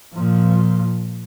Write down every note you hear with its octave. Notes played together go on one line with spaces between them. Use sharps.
A#2 F3